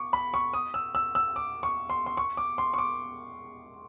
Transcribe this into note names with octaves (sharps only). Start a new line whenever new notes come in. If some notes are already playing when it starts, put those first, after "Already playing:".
Already playing: C#6 D6
B5
C#6
D#6
E6
E6
E6
D6
C#6
C6
C6
C#6
D6
C6
C#6
D6